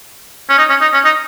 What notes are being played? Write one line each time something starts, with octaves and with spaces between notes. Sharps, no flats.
C#4
D#4
C#4
D#4
C#4
D#4